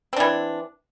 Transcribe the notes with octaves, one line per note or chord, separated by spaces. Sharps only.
E3 C4 D4